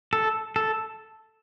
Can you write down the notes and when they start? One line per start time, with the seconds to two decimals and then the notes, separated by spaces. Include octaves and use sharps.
0.13 A4
0.56 A4